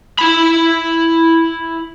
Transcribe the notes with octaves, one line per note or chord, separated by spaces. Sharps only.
E4 B5